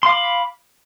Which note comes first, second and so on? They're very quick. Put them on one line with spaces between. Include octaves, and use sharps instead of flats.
C6 F5 D6 B5